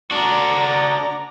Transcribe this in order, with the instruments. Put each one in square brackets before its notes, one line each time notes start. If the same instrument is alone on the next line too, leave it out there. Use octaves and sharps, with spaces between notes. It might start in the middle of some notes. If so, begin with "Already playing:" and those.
[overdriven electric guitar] D4 F#4 [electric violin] D5 A#5